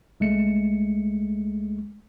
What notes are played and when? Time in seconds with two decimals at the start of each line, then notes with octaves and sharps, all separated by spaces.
0.20 C2 G#3 A3 C#7